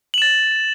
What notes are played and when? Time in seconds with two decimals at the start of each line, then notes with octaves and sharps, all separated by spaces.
0.14 F#7
0.18 E7
0.22 A6